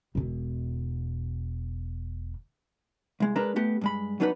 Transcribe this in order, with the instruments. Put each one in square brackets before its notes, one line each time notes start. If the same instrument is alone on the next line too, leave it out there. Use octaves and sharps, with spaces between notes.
[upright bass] E1 B2
[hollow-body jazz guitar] C2 G#3
G#3 D4 A#4 B4 A#5
A3 B3 G4
G2 G#3 B5
F#3 B3 D4 D#4 A4 B4